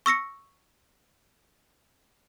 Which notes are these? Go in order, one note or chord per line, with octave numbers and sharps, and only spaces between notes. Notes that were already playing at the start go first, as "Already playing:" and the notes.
C#6 E6 A#6 C#7